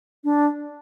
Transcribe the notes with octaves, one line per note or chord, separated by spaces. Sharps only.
D4